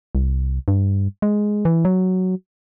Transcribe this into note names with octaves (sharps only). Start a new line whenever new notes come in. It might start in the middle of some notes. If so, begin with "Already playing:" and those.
C2
G2
G#3
E3
F#3